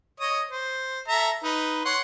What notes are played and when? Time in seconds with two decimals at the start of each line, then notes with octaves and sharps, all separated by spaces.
0.20 C#5 D#5 D#6
0.49 C5
1.08 A4 E5 A#5
1.44 D#4 B4
1.85 C#5 F#5 C6